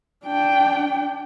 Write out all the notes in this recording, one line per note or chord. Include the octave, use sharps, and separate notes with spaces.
D4 G5